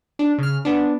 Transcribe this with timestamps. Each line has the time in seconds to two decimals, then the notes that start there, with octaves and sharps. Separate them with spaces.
0.19 D4
0.38 C#3 F6
0.65 B3 D4